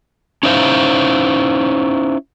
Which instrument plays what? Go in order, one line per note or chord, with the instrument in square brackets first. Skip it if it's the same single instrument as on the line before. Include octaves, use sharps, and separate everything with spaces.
[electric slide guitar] C#4 D#4 E4 C5 F5